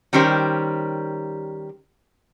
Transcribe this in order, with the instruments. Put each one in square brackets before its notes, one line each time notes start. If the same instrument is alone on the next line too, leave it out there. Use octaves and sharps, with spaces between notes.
[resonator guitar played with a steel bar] D#3 G3 C#4 G4 A#4 C5